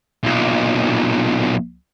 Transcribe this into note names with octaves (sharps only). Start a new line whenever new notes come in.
B1 A#2